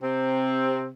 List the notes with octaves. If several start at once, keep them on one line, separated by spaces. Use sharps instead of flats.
C3 C4